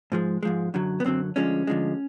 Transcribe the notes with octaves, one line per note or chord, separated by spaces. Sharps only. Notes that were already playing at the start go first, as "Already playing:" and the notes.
G#2 F3 G#3
G#2 F3 G#3
F#2 D3 F#3
B3
F#2 D3 F#3 C4
D2 D3 F3 G#3 C#4
D2 D3 F3 G#3